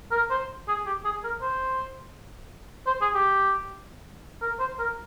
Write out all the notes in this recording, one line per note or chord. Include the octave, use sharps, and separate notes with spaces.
A#4
C5
G#4
G4
G#4
A#4
C5
C5
G#4
G4
A#4
C5
A#4